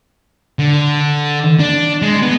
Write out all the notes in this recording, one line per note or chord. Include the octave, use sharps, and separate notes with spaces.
D3
D4
G#3
B3